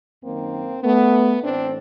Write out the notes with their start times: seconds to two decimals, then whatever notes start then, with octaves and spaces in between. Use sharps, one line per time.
0.23 F#2 D#3 A#3 C4
0.83 A3 B3
1.43 A2 E3 C4 D4